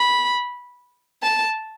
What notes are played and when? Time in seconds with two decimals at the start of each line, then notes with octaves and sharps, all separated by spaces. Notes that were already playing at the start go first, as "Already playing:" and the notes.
Already playing: B5
1.22 A5